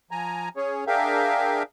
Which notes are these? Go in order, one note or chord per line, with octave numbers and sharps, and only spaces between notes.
F3 G#5 A#5
C#4 G#4 C#5
D4 G#4 A#4 E5 F5 G5